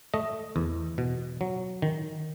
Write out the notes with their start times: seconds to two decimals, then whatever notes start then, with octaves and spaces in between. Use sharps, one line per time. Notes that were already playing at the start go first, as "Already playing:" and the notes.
0.14 A3 D#5
0.56 E2
0.98 B2
1.41 F#3
1.82 D#3